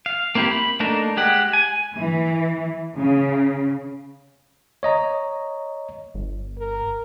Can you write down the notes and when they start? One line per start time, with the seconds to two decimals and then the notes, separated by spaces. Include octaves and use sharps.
0.06 F5
0.35 A#3 C4 E4 G4
0.51 B5
0.80 A3 A#3 D4 D#4 A#4
1.17 G#3 G4 F#5
1.53 G#5
1.96 E3
2.97 C#3
4.83 C#5 D#5 A#5
6.14 G1
6.58 A#4